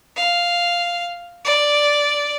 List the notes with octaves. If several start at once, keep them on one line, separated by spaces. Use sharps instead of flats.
F5
D5